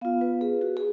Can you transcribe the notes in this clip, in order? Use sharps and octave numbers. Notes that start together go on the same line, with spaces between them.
B3 F4 F5
B4
G#4
F#4
G#4